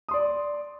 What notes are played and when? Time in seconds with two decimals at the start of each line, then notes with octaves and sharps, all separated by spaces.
0.09 D#6
0.11 C6
0.14 D5